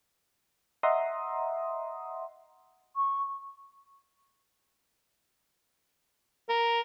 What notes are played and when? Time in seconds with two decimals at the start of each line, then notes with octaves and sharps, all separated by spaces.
0.83 D#5 E5 F#5 A#5 C6 D#6
2.96 C#6
6.49 A#4